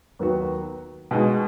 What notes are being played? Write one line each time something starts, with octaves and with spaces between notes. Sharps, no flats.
D#2 D#3 F#3 B3 F#4
B2 G#3 D#4 F#4